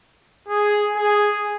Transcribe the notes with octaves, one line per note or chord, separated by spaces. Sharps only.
G#4
G#4